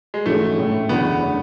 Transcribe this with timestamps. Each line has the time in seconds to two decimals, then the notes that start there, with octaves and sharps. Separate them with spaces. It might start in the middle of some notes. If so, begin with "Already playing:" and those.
0.14 G#3
0.26 G#2 E3 G#3 A3 C#4 F#4
0.57 A2 G#3 C#4 G#4
0.89 F#1 E2 D3 F#3 B3
1.21 D3 A3 C#4